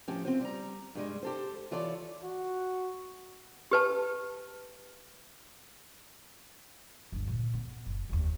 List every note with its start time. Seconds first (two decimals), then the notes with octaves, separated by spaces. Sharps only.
0.08 A2 F3 C#4 G4
0.25 C4 F4 C5
0.41 G3 A#5
0.95 G2 G3 G#3
1.23 G4 A4 C5
1.71 E3 F4 A4 C#5 D5
2.23 F#4
3.71 G4 B4 A5
7.12 G1 D2
7.27 A#2 D3
7.54 B3
7.86 F#1
8.09 F1 D#2